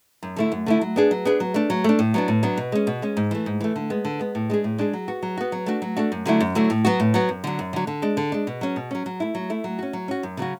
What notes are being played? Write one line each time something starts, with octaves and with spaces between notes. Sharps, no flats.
F#2
D3 A3 E4
F#2
D3 A3 E4
F#3
B3 D4 G#4
F#3
B3 D4 G#4
F#3
A3 D4
F#3
A3 D4
A2
F#3 B3 D4
A2
F#3 B3 D4
B2
G#3 C#4
B2
G#3 C#4
G#2
E3 A3
G#2
E3 A3
D3
G#3 B3
D3
G#3 B3
A2
G#3 D4 G#4
A2
G#3 D4 G#4
F#3
B3 F#4
F#3
B3 F#4
F#3
A3 D4 F#4
F#3
A3 D4 F#4
F#2
D3 F#3 A3 E4
F#2
D3 F#3 A3 E4
A2
F#3 B3 F#4
A2
F#3 B3 F#4
F#2
D3 F#3
F#2
D3 F#3
D3
G#3 D4
D3
G#3 D4
B2
F#3 C#4
B2
F#3 C#4
F#3
A3 E4
F#3
A3 E4
F#3
C#4 F#4
F#3
C#4 F#4
F#2
C#3 F#3 C#4 F#4